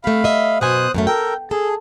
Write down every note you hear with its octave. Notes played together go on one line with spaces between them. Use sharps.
C3 A3 F5 B5
D#5 E5
F#2 B2 C5 G#5 D#6 F#6
F#2 C#3 A3
A4 A#4 G5
G#4 A4